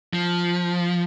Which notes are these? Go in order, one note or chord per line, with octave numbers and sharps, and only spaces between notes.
F3